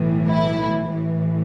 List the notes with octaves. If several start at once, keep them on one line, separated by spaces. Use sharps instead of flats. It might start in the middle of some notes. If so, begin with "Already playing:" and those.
Already playing: B1 A2 E3
E4
A1 A2 E3